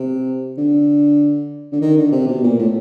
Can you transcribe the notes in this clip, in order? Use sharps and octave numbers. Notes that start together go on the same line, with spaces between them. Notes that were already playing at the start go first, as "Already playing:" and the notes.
Already playing: C3
D3
D3
D#3
D3
C3
B2
A#2
A2